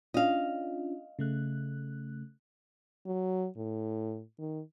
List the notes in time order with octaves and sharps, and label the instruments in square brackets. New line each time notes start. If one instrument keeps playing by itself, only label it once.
[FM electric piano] C#4 D4 F4 [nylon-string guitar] D#5 F5
[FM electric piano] C#3 A3 F#6
[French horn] F#3
A2
D#3